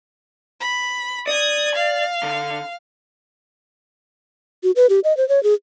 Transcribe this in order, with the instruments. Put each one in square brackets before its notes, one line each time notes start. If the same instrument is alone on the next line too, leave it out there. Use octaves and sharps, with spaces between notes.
[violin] B5
[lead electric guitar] D5 [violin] D#6 G#6
[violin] F5
[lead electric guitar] D3
[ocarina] F#4
B4
G4
D#5
C5
C#5
G#4